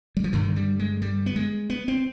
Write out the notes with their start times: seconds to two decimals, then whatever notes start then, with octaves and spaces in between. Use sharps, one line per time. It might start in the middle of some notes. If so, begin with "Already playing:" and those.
0.17 G3
0.24 F3
0.33 G2 D3 D#3
0.56 G3
0.79 G#3
1.02 G3
1.26 B3
1.36 G#3
1.70 B3
1.88 C4